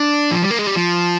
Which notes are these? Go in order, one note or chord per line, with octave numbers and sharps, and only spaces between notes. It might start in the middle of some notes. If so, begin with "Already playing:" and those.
Already playing: D4
F3
G3
A#3
G#3
G3
F3